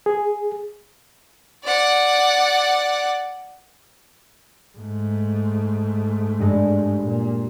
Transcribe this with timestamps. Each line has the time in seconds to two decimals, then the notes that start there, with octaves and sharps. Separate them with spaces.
0.06 G#4
1.64 D5 F#5
4.78 G#2 A3
6.39 G2 G#3
7.03 A#2